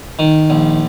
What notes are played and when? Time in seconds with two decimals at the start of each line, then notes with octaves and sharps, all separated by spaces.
0.19 D#3
0.50 A#1